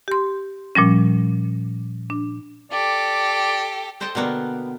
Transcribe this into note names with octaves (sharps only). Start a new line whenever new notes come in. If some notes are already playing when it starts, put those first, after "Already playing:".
G4 C6
A#2 F3 G3 C#4
D4
G4 A4 D5
A4 C5 D#5 G5 A5
B2 D3 A#3 B3